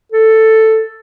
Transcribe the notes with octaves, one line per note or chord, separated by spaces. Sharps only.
A4